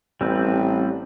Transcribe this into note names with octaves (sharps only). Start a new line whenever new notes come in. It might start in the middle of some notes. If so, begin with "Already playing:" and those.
A1 G3 C4 B4